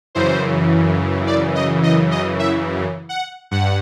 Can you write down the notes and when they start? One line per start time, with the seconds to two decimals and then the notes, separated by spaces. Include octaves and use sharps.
0.15 F#2 C#3 E3 C5
1.27 D5
1.55 D#5
1.83 D#5
2.11 D#5
2.39 E5
3.09 F#5
3.51 G2 F#5